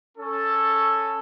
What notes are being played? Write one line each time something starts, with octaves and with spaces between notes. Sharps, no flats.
C#4 A4